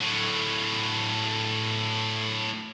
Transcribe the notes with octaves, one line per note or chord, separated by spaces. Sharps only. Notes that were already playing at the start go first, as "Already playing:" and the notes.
A2 F#3